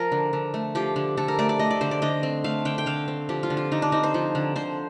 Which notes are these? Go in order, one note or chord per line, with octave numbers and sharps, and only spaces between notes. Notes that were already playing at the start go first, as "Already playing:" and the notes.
Already playing: F3 A#4
D3
D3
A3
F3 G4
D3
D3 A4
A#4
A3 D5
D5
A3 D#5
D5
D3 C5
D5
D3 D#5
C4
A3 F5
D3 G5
G5
D3 F5
C4
F3 G4
F4
D3
F4
D3 D#4
D4
C4 D#4
C5
F3
D3
D3 C5